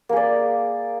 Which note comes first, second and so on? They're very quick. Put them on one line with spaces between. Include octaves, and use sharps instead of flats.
A#3 G#4 D5